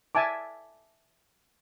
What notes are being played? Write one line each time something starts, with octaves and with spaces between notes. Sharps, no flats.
E5 G#5 A5 D6